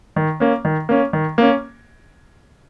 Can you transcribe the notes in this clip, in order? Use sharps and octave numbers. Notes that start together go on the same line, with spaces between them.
D#3
A#3 C#4
D#3
A#3 C#4
D#3
A#3 C#4